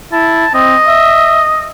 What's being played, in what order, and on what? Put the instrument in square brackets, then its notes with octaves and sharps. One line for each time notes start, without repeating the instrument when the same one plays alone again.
[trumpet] E4 [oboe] A5
[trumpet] C4 [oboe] D#5
[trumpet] E5